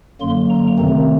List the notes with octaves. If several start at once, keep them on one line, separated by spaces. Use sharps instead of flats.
F#2 D3 F#3 A#3 C6
A#5
C3 D#3 A3 C4